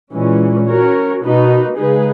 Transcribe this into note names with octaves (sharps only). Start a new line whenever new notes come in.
A#2 E3 G#3 C#4
C#4 F#4 A#4 C#5
B2 A#3 D#4 F#4 B4
C#3 G#3 D#4 G#4 B4